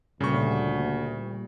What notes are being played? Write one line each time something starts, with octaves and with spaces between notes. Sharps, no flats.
D2 A#2 C#3 G3 C#6